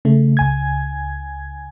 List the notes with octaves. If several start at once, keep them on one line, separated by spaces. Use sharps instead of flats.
C#3 A3
C#2 G#5 G#6